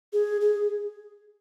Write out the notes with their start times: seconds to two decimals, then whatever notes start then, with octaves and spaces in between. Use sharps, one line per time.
0.13 G#4
0.41 G#4